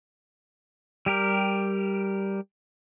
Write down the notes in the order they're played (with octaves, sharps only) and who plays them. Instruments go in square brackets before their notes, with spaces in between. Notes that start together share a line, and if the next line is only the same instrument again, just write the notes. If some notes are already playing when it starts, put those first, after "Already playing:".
[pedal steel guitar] G3 G4 A#4